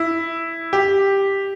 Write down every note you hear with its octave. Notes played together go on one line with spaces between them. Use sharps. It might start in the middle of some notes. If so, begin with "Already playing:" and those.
Already playing: E4
G4